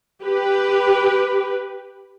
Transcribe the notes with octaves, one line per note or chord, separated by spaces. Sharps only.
G4 B4